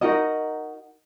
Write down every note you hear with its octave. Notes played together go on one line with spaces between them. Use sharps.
D#4 F#4 A#4 D#5